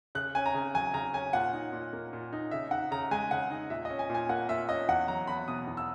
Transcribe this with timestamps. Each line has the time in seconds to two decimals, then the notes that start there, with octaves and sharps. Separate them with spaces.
0.15 C#3 F#6
0.35 C#4 G#5
0.46 A#5
0.54 C#3
0.74 F#3 G#5
0.94 C#3 A#5
1.14 C#4 G#5
1.33 A#2 F#5
1.53 D#4
1.73 A#2
1.93 A#3
2.13 A#2
2.33 D#4
2.51 C#3 E5
2.71 D#4 F#5
2.91 C#3 A#5
3.11 G#3 G#5
3.31 C#3 F#5
3.51 D#4
3.70 A#2 E5
3.85 D#5
3.90 C#4
3.99 G#5
4.10 A#2 G#5
4.29 A#3 F#5
4.49 A#2 E5
4.69 C#4 D#5
4.88 E2 F#5
5.08 F#3 A#5
5.27 E2 B5
5.48 B2 D#6
5.67 E2
5.77 E6